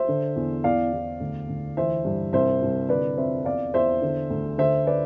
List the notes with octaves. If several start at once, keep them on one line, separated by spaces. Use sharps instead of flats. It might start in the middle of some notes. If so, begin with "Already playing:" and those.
Already playing: C5 E5
D3
E2
E2 D5 F5
E2
D2
D2
E3 C5 E5
G2
C2 C5 E5
C2
D3 B4 D5
F2 C5 E5
E2 D5 F5
E2 C5 E5
D3
D2
D3 C5 E5
B4 D5